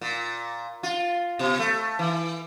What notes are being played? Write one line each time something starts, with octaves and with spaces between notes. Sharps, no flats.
A#2
F4
B2
A3
E3